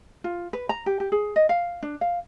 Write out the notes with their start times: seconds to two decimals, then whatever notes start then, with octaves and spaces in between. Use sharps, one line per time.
0.24 F4
0.53 B4
0.69 A#5
0.86 G4
1.00 G4
1.12 G#4
1.36 D#5
1.49 F5
1.82 D4
2.01 F5